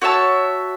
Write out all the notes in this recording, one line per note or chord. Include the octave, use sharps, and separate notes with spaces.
F#4 C#5 E5 A5